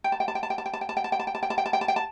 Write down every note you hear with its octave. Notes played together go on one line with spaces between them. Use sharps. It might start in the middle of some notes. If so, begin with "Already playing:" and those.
G5
A5
G5
A5
G5
A5
G5
A5
G5
A5
G5
A5
G5
A5
G5
A5
G5
A5
G5
A5
G5
A5
G5
A5
G5
A5